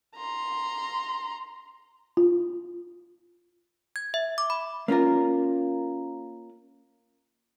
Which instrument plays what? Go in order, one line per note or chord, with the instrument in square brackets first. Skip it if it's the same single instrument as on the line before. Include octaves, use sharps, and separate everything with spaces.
[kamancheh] A#5 C6
[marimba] F4
[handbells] G#6
E5
D6
B5
[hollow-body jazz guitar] A#3 C#4 F4 A#4